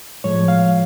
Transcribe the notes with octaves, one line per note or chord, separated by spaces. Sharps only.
A2 F3 G#3 C#5
F5